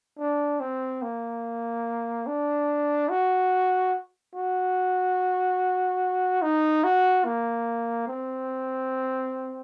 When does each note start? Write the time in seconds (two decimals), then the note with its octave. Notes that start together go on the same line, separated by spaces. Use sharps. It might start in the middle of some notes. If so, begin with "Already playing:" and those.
0.19 D4
0.61 C4
1.02 A#3
2.27 D4
3.09 F#4
4.35 F#4
6.42 D#4
6.84 F#4
7.25 A#3
8.08 C4